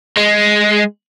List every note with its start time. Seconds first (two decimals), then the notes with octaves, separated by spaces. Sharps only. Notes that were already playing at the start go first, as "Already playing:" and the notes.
0.17 G#3